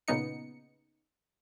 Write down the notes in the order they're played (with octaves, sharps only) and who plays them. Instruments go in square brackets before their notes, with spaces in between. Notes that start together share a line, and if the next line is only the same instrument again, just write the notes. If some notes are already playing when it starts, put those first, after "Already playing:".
[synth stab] A#2 C#3 B3 D#4 C#7